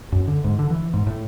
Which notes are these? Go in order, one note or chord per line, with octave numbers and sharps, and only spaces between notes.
F#2
D3
G#2
D3
E3
G#2
A2